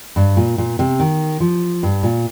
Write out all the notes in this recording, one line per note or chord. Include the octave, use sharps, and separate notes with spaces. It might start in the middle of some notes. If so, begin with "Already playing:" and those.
G2
A#2
A#2
C3
D#3
F3
G2
A#2